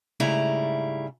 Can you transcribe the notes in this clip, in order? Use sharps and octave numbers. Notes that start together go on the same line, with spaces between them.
G#2 C#3 G3 A3 E4 A#5